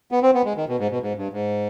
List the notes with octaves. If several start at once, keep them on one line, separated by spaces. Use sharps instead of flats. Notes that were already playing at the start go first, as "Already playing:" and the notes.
B3
C4
B3
G#3
D#3
B2
G#2
B2
G#2
G2
G#2